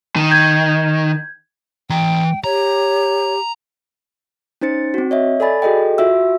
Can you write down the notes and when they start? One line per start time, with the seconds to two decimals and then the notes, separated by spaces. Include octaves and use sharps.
0.16 D#3
0.31 G6 G#6
1.90 E3 G5 A#5
2.44 G4 C#5 A#5
4.61 C#4 D#4 C5 A6 C#7
4.94 C4 F#4
5.11 C#5 D#5 E5
5.40 A4 D5 G#5 B5 A6
5.62 F#4 G#4 A4 D#5 G5
5.98 F4 F#4 E5 E6